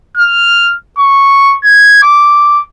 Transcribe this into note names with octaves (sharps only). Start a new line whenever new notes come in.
F6
C#6
G#6
D6